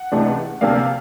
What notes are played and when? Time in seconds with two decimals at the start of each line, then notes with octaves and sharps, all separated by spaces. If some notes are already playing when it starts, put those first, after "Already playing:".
Already playing: F#5
0.12 C#2 C3 E3 A3 D4
0.61 D2 C3 F3 A#3 D4 F5